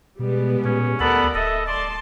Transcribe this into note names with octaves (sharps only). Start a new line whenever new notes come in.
B2 G3 G#3 B3
A#2 C#4
D2 B3 A4 A#4 D5 F#5 B5
D1 A4 D#5 E5
D5 A5 C6